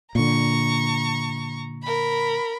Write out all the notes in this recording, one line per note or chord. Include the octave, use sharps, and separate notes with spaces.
A#2 D3 A#5 C#6
A#4 B5